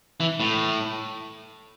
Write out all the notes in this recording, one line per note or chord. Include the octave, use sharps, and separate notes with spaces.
E3
A2